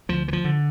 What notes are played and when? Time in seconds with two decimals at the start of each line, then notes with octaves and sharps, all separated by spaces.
0.09 D2 F3
0.28 E3
0.33 F3
0.44 D3